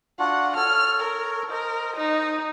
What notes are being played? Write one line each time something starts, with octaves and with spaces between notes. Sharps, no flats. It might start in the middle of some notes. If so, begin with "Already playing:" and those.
D4 F4 F#4 F#5
A4 C#5 F6
A#4
A#4 C5 D#5
D#4